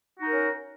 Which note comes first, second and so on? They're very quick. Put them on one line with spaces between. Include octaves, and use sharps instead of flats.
F#4 D#4 A#4 C#4